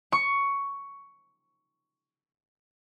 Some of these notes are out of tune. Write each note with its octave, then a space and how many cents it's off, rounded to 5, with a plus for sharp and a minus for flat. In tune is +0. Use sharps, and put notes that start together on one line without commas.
C#6 +10